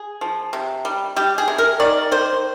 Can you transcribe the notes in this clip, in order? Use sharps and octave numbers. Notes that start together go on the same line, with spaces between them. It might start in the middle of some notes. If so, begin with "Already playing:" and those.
Already playing: G#4
F3
C3
G3
G3 G4
G#4
C3
A#4
D#3 D5
D#3 C5